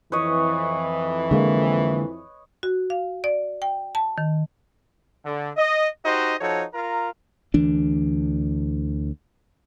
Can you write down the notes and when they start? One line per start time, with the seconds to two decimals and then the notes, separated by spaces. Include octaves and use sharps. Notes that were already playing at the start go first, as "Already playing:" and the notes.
0.12 F2 E3 B4 C#5 D#5
1.31 D3 G#3 A#3
2.63 F#4
2.90 F5
3.24 D5
3.62 G5
3.95 A5
4.18 D#3
5.24 D3
5.57 D#5
6.05 D#4 F#4 G4 C5 D#5
6.40 F3 D#4 F#4 A4 C#5
6.74 F4 A#4 A#5
7.54 D2 E3 D4